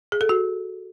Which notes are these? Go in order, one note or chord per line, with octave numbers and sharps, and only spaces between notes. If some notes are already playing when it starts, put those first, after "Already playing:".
G#4
A4
F#4